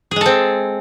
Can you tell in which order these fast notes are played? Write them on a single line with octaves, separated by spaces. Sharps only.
G#4 G#3 A4 C4